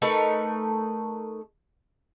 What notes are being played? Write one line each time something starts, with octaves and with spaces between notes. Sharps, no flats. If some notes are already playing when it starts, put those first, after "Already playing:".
A3 D#4 A#4 B4